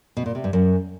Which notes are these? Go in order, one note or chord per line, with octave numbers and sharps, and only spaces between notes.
B2
A#2
C3
G2
F#2